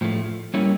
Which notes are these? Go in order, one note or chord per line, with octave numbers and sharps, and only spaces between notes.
A2 F3 A3
G3 A#3 C#4 E4